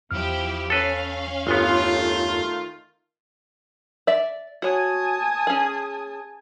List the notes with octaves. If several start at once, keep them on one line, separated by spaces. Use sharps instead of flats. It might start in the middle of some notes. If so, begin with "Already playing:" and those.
E2 F3 E4 G4 F6
C#4 A4 B4 F5
G1 D#3 A3 B3 F4
D5 E5
F#4 C#5 G#5 A5 D#6
C#4 G#4